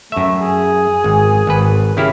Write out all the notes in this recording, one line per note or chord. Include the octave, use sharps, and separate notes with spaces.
F#2 A3 E5
G#4
G#1
G#1 B4
C#3 E4 G4 F5